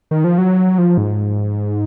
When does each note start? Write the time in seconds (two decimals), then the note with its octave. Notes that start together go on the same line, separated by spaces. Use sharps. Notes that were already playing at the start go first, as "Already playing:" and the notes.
0.11 D#3
0.24 F3
0.38 F#3
0.78 F3
0.98 G#2